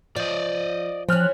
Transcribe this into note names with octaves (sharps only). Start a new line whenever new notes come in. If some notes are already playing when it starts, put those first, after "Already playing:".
F3 D5 D#5
E3 F3 C#4 C5 F6 F#6